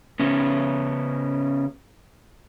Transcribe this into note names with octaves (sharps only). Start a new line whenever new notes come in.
C#3 B3 C#4